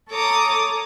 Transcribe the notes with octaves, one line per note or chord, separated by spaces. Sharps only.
A4 C#5 A#5 D6 D#6